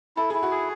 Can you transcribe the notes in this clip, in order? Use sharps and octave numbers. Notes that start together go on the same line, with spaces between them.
E4 A4
E4 G#4
F#4
G#4